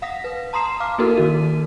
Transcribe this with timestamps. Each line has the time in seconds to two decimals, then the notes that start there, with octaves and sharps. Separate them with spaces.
0.02 F5 F#5 D#6 A#6 B6
0.24 B4
0.53 A5 A#5 C6 D#6 C7 E7
0.80 F5 D6 F6
0.98 A#3 D#4 E4 F#4 A4 A#4
1.15 D#3 F#4 D#7